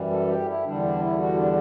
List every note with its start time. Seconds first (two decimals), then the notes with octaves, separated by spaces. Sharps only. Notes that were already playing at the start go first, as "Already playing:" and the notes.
Already playing: F#2 E3 G3
0.10 A4
0.28 G4
0.46 E4
0.64 E2 D3 G3 D4
0.82 D4
1.00 E4
1.18 F#4
1.36 D4